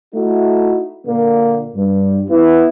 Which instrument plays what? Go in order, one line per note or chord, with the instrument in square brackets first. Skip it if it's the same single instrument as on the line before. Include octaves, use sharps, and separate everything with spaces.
[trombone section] A3 D#4 E4 F#4
A#2 D3 A#3
G2
B3 E4